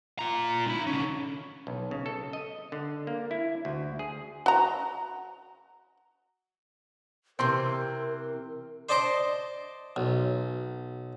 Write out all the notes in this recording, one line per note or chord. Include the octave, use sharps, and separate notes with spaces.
F4 A#5
D#4 B5
D3 C#4
B1
C#3
A4
D#5
D3
A#3
E4
D2
G#4
F#4 A#5
C3 E3 C4 A#4 C6 E6
C5 D5 D#5 A5 C6 D6
B1